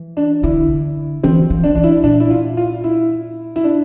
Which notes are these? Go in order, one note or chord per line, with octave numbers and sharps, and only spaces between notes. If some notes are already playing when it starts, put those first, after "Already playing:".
Already playing: E3
D4
D3 E4
E3 C4
F3
D4
E3 D4
E4
A#2 D4
E4
F4
F4
E4
E4
D4